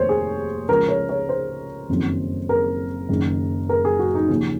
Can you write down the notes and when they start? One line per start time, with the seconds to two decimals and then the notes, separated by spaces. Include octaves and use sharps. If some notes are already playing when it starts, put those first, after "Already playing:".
Already playing: F1 D#2 D#3 C5 C#5
0.09 G#4
0.69 C#2 C#3 F3 A#4
0.89 C#5
1.09 C#5
1.29 C5
1.89 F#1 F2 D#3 F#3
2.49 A#4
3.09 F#1 F#2 D#3
3.69 A#4
3.85 G#4
3.99 F#4
4.15 D#4
4.29 D#2 C#3 F3 C#4